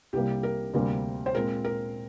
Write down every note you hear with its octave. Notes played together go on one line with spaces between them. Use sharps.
C2 C3 G3 A#3 G4
A#4
D2 C3 G3 A#3
C5
A#2 G#3 C4 A#4
A#4